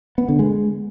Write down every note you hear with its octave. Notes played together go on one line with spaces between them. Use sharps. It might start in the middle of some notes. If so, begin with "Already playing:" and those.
B3
D3
G#3